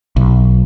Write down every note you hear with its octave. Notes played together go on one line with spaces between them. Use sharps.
B1